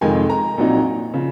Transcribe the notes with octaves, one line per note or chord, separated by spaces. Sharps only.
F1 F2 D#3 G#3 G#5
A#5
A#1 A#2 F#3 C4 D#4
C#3 F3